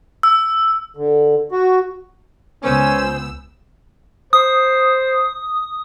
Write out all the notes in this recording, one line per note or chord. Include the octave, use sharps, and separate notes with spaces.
E6
D3
F#4
C#2 B3 C#4 C5 G#5 E6
C5 D#6